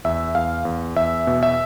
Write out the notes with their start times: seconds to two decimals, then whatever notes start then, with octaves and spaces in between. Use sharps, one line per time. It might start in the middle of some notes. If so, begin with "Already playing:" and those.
0.04 E2 E5
0.35 E2 F5
0.65 E2
0.96 E2 E5
1.27 B2
1.43 E5